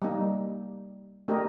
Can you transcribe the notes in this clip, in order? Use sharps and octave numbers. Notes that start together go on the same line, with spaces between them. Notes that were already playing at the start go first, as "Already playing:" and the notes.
G3 A#3 D#4
A3 D4 G4 A#4 D#5